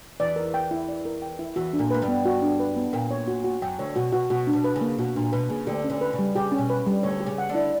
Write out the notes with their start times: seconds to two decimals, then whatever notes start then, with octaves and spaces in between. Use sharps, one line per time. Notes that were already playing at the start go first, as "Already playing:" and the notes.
0.20 E2 E3 D5
0.36 A#4
0.54 G5
0.71 E4
0.89 D5
1.05 A#4
1.22 G5
1.39 E4
1.56 E2 E3 F#4
1.73 D4
1.79 A#2 A#3
1.91 A#3 B4
2.02 G2 G3
2.08 B3
2.25 F#4
2.42 D4
2.60 B4
2.76 B3
2.93 A#2 A#3 G5
3.11 C#5
3.28 F#4
3.44 F#4
3.62 F#2 F#3 G5
3.79 D2 D3 C#5
3.96 B2 F#4
4.12 B2 F#4
4.30 B2 F#4
4.47 D4
4.53 B2
4.64 B4
4.76 C#3
4.81 A#3
4.99 B2 F#4
5.16 A#2 D4
5.32 B2 B4
5.50 C#3 A#3
5.67 D2 D3 G4
5.84 C#4
5.90 D2 D3
6.01 B4
6.13 C#3
6.19 G3
6.36 C#3 G4
6.52 C#4
6.58 B2
6.70 B4
6.86 G3
7.03 D2 D3 C#5
7.20 G4
7.26 C#3 C#4
7.38 F#5
7.49 D3 D4
7.55 E4